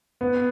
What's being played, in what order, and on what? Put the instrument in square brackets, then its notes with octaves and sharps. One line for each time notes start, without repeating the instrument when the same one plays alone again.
[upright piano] B3